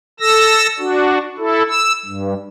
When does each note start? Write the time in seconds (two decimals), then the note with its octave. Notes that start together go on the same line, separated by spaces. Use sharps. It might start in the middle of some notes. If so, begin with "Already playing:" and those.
0.20 A4 E6 A#6
0.79 D4 F#4
1.38 E4 A4
1.68 E6
2.06 G2